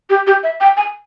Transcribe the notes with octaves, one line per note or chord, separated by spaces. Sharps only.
G4
G4
E5
G5
G#5